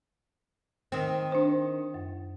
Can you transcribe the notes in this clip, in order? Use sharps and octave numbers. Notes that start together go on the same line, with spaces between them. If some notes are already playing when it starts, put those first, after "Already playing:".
D#3 C4
D4 C5
F#2